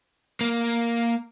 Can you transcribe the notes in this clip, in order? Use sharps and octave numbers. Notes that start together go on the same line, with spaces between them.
A#3